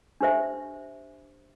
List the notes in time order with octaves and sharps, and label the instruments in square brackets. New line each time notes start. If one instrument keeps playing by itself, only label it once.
[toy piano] D4 G4 C5 E5